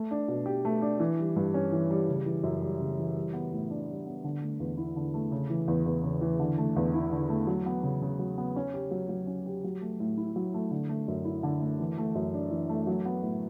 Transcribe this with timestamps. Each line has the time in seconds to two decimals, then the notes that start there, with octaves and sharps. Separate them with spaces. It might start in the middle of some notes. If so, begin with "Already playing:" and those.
Already playing: A3
0.11 D4
0.28 B2
0.46 G4
0.65 A3
0.82 D4
1.00 E3
1.19 G3
1.36 G2
1.54 C#4
1.72 E3
1.91 G3
2.09 C#3
2.26 E3
2.44 F#2
2.62 G3
2.80 C#3
2.98 E3
3.16 G3
3.33 B3
3.52 A2
3.70 D4
3.88 G3
4.07 B3
4.24 D3
4.42 A3
4.60 E2
4.77 E4
4.96 D3
5.14 A3
5.32 C#3
5.50 E3
5.68 E2
5.86 E2
6.03 C#3
6.21 E3
6.40 D3
6.58 A3
6.76 E2
6.94 E4
7.12 D3
7.29 A3
7.47 F#3
7.66 B3
7.83 C#3
8.02 C#3
8.19 F#3
8.38 B3
8.56 C#4
8.74 G4
8.91 F#3
9.09 F#3
9.27 C#4
9.46 G4
9.64 F#3
9.81 A3
10.00 A2
10.17 E4
10.36 F#3
10.54 A3
10.71 D3
10.89 A3
11.08 F#2
11.25 E4
11.43 D3
11.61 A3
11.80 E3
11.98 A3
12.15 F#2
12.34 D4
12.51 E3
12.69 A3
12.87 F#3
13.05 B3
13.23 A2